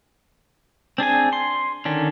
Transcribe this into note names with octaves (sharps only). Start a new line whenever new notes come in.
C4 D4 G#4 G#5
C6
D3 D#3 C#4 D4